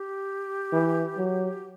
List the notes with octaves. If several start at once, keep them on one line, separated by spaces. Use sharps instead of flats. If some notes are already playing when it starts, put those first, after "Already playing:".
Already playing: G4
E3
F#3